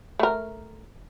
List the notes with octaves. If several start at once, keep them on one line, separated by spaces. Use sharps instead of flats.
A3 A#4